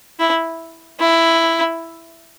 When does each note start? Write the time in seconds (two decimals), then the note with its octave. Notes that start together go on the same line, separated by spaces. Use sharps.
0.19 E4
1.00 E4